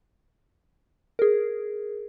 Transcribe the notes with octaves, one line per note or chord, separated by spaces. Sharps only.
G#4 A#4